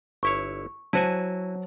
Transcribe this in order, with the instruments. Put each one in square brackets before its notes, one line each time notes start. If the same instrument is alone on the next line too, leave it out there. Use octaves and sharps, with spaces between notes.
[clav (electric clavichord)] G1 E4 C#5 [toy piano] C#6
[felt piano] F#3 [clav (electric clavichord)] E4 F#4 G#5 [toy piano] C5 A5